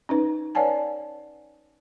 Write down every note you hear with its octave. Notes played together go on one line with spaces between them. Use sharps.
C#4 D#4 B4
B4 C#5 D5 F#5 G#5 A5